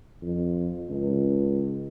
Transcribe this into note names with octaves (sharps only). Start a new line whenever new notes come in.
F2
C#2